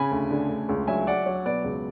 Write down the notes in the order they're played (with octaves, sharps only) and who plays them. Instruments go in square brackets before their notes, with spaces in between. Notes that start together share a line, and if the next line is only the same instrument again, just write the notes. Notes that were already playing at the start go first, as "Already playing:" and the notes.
Already playing: [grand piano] C#3 G#5 B5
D2
D3
D2
C#2
F#3 E5 G#5
F#3 D5 F#5
F#3 C#5
B2 B4 D5
C#2